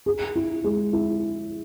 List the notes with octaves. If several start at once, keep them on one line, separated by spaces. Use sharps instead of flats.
G#4
E4
G#3
E4